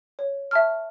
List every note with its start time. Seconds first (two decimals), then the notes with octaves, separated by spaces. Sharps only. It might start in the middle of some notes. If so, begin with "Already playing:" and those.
0.19 C#5
0.51 E5 A5 C#6 F6